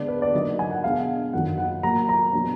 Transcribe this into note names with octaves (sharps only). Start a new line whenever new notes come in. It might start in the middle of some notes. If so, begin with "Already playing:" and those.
Already playing: D3 G#3 B3 D4 D5
B4
D5
D3 F#3 A#3 D#4 D#5
G#5
F#5
B2 G#3 D4 F5
F#2 D#3 F#3 F#5
F#5
A#2 F#3 A#3 A#5
A#5
B2 F#3 D4